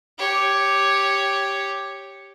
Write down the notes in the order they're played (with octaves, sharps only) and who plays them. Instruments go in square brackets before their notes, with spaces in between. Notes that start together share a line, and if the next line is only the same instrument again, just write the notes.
[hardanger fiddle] G4 C#5